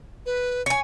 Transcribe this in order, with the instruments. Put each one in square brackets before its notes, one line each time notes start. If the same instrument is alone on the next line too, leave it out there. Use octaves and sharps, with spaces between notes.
[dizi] B4
[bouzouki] C#5 G#5